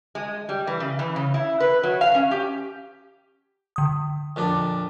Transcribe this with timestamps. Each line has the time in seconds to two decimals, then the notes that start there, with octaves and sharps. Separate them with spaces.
0.15 G#3
0.49 G3
0.67 E3
0.80 C#3
0.99 E3
1.16 C#3
1.34 E4
1.60 B4
1.83 F#3
2.01 F5
2.15 C#4
2.31 G4
3.76 D3 D#6
4.36 F2 A#2 D4